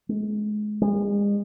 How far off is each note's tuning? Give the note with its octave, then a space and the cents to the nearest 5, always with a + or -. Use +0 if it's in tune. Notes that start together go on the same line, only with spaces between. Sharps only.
G#3 +25
G#3 -40